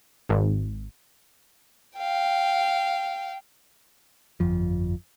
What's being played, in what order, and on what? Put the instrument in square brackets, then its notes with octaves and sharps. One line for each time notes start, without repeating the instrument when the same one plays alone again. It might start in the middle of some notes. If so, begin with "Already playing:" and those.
[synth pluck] G#1
[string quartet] F5 G5
[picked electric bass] G1 F2 F3